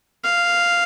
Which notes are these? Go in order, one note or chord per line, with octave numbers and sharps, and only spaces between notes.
F5